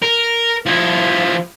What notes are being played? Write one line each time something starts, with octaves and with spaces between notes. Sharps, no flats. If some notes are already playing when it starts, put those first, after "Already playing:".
A#4
F3 E4